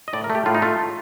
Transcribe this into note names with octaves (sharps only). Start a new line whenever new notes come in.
D#5
A2 D5
A#4
A3
G4
A2 F4
D#4
A3 F4